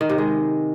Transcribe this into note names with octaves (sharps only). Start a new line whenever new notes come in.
D#3
C3
G#3